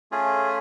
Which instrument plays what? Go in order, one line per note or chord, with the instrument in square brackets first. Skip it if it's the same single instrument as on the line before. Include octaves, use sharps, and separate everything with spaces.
[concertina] A3 C#4 F4 G#4